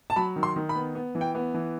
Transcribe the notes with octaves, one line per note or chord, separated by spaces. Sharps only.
A5
F#3 B5
D#3
C6
D#3
B5
B3
B3
E3
G5
B3
E3